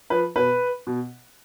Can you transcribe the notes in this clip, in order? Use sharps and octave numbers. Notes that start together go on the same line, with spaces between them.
F3 B4
B2 B4
B2